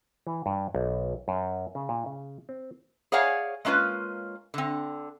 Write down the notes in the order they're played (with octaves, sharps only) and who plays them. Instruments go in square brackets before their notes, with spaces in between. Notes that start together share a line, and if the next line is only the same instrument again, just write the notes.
[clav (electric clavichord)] E3
G2
B1
F#2
C#3
A#2
C#3
C4
[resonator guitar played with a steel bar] G#4 C#5 D5 F5 F#5 G#5
G#3 A#3 C#4 F4 B4
D3 C4